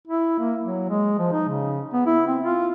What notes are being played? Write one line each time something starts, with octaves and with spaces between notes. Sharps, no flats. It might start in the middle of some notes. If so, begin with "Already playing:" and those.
E4
A#3
F#3
G#3
F3
D#4
C#3
B3
E4
C4
F4